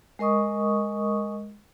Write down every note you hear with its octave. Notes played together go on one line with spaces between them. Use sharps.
G#3 A#4 D#5 C#6 D#6